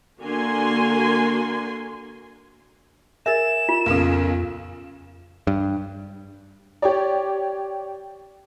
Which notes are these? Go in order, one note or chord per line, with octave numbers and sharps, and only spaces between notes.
D3 A#3 F#4 A#4 G#5 C6
G#4 A#4 E5 E6 A6 E7
F4
B1 F2 A#2 C#3 F4 A4
G2
G4 C#5 D5